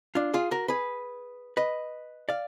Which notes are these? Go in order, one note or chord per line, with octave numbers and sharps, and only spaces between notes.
D4 F4
F4 G#4
F#4 A#4
G#4 B4
B4 D#5
D5 F5